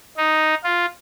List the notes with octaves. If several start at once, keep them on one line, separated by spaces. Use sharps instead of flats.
D#4
F4